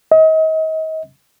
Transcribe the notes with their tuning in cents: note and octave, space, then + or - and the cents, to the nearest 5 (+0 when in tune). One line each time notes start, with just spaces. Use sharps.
D#5 +35